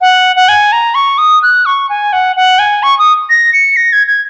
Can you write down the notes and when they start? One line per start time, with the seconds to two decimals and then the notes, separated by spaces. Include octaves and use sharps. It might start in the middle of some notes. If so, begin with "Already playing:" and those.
0.01 F#5
0.36 F#5
0.49 G#5
0.72 A#5
0.95 C#6
1.18 D#6
1.43 F#6
1.66 C#6
1.89 G#5
2.13 F#5
2.36 F#5
2.59 G#5
2.83 C#6
2.99 D#6
3.30 A#6
3.53 C#7
3.77 A#6
3.93 G#6
4.07 G#6